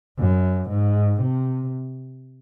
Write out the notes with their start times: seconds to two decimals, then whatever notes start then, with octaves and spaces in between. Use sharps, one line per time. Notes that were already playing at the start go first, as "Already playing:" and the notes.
0.19 F#2
0.69 G#2
1.21 C3